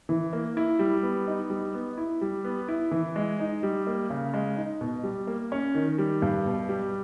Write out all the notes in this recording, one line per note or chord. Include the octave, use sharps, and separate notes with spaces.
E3
A#3
E4
G3
B3
D#4
G3
B3
E4
G3
B3
E4
E3
G#3
D#4
G3
A#3
C#3
G#3
D#4
B2
G3
A#3
C#4
D#3
G3
G2
B2
G3